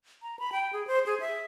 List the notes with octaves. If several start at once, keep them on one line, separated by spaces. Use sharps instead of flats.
A#5
B5
G5
G#4
C5
G#4
E5